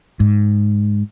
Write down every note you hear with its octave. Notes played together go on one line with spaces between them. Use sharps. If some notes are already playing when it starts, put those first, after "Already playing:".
G#2